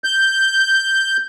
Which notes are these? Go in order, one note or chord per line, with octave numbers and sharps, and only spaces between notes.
G6